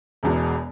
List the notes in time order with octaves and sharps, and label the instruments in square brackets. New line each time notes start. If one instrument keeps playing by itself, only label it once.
[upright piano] E1 E2 B2